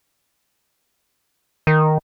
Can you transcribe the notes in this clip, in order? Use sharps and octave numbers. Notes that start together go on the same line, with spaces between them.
D#3